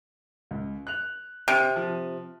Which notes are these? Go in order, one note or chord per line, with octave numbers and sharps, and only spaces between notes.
C#2
F#6 F7
C3 C4 F6 D#7
F3